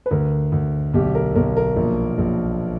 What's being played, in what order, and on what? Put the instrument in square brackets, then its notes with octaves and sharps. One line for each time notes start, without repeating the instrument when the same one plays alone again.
[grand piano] B4
D2 A#4
D2
B1 G4
A#4
B1 A#4
A#4
A#1
A#1